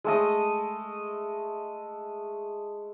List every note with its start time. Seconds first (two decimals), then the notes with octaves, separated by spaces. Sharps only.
0.04 G#3 A3 D#5